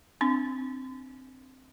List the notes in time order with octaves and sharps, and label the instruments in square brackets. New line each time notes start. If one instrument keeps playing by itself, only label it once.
[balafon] C4 D4